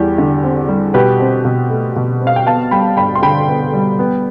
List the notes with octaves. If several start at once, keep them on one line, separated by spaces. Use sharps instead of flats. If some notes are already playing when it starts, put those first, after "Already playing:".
Already playing: E2 G3 G4
D3
C4
G3
B2 G4 B4
C4
B2
A3
B2
C4
F5
G5
B3 F5 A5
G3 G5 B5
G2 G5 B5
C6
D3 G5 B5
B3
G3
B3